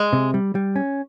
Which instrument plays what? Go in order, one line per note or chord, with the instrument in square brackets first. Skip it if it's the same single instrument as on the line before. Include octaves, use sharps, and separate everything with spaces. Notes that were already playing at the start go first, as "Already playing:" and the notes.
Already playing: [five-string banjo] G#3
[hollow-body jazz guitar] C3
G3
G3
C#4